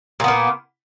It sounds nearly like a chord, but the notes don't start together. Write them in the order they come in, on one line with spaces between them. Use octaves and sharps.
A#2 B3 A#3